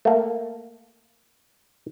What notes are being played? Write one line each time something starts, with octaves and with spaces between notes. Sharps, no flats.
A3 A#3